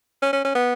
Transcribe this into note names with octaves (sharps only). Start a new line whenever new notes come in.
C#4
C#4
C#4
B3